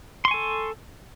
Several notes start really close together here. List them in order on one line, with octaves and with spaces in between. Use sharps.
C6 C#6 G#5 A4